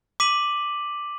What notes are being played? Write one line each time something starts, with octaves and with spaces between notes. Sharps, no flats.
D6 B6 D#7 F#7